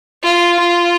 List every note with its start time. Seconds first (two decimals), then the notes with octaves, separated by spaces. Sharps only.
0.23 F4
0.59 F4